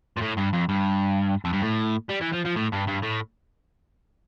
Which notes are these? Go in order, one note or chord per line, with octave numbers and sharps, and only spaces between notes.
A#2
A2
G2
F2
G2
F2
G2
A2
G3
E3
F3
F3
A2
G2
G2
A2